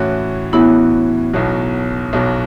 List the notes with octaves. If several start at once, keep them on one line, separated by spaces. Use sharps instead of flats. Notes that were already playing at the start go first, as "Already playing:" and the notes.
Already playing: A2 E3 C#4 F#4
A2 E3 B3 C#4 E4 F#4
B1 B2 F#3
B1 B2 F#3